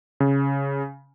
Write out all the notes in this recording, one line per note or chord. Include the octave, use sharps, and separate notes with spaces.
C#3